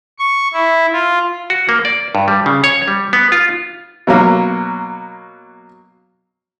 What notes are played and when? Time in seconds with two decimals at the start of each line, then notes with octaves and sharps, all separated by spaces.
0.19 C#6
0.53 E4
0.92 F4
1.50 F#4
1.69 A#3
1.85 D5
2.15 G2
2.28 G3
2.46 C#3
2.64 C#5
2.88 G3
3.13 B3
3.32 F4
4.07 B2 F#3 A#3